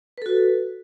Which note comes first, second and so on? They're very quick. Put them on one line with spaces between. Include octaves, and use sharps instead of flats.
B4 A4 F#4